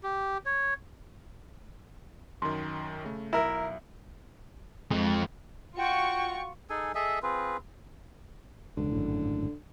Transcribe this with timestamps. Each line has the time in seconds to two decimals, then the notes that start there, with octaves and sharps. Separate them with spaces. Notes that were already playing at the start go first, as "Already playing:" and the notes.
0.03 G4
0.46 C#5
2.42 F#2 D#3 C6
3.05 C#3 A3
3.33 B1 E4 A#4 E5
4.91 F2 G#3
5.77 F4 F#4 G5 C#6
6.70 D#4 G#4 A4 G#5
6.95 G#4 A4 D#5 E5
7.23 C4 F4 G#4 B4
8.77 E1 C#2 D3
8.92 G#1 F#2 A2